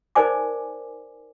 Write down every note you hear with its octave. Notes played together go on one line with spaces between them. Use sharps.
D#4 A#4 C5 D5 G#5 D6